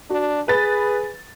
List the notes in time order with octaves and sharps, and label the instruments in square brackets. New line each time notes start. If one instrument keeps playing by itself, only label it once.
[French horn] D4 [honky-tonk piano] F#4
[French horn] G#4 [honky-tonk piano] B4 A6